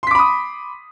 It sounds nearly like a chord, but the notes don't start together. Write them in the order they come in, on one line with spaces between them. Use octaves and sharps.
C6 B6 D6 B5 D#6